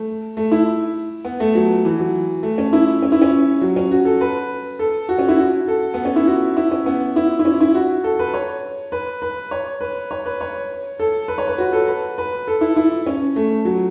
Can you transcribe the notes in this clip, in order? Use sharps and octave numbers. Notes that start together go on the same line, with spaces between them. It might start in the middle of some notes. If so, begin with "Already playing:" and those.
Already playing: A3
A3
E4
B3
A3
F#3
E3
F#3
A3
C#4
E4
C#4
E4
C#4
F#3
C#4
F#4
A4
B4
A4
F#4
C#4
E4
F#4
A4
B3
C#4
E4
F#4
E4
C#4
B3
E4
E4
C#4
E4
F#4
A4
B4
C#5
B4
B4
C#5
B4
C#5
B4
C#5
A4
B4
C#5
B4
F#4
A4
B4
B4
A4
E4
E4
C#4
A3
F#3